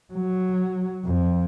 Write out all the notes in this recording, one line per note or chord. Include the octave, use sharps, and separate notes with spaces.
F#3
F2